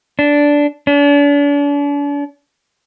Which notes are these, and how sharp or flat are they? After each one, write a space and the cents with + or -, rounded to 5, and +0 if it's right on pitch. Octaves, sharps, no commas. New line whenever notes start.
D4 -10
D4 -40